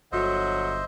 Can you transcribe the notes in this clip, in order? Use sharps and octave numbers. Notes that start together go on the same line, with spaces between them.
G1 D3 F#3 C5 D#5 E5